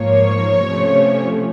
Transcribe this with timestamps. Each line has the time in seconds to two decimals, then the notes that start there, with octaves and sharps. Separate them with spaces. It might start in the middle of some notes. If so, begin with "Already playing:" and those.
Already playing: G#2 F3 A#3 C#5
0.66 C3 F3 A3 C#4